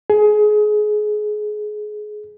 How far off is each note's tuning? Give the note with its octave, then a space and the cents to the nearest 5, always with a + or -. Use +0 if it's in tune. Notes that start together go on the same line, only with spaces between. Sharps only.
G#4 +25